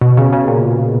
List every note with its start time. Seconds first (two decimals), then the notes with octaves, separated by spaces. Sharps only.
0.01 B2
0.17 C#3
0.33 C#3
0.48 A#2